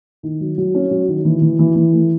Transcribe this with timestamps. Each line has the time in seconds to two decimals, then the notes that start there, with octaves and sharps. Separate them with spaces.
0.23 D#3
0.40 F#3
0.58 F#3
0.74 C#4
0.91 F#3
1.08 D#3
1.25 E3
1.42 E3
1.59 E3
1.75 E3
1.93 A3